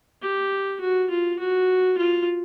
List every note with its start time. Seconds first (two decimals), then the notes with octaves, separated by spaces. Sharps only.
0.22 G4
0.80 F#4
1.10 F4
1.39 F#4
1.98 F4